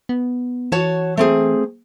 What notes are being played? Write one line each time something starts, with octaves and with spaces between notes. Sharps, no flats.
B3
E3 F#4 C#5 A5
A3 C4 G#4